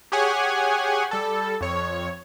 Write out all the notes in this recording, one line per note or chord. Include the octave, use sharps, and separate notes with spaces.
G4 G#4 C#5 F#5 G#5
G3 A4
F2 C#5